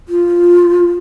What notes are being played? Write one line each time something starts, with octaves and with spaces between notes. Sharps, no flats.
F4